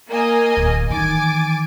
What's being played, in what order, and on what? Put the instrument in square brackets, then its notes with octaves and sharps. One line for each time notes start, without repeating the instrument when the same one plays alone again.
[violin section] A#3 D#5 G#5
[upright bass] D1
[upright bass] D#3 E3 [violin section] G#5 D6 A6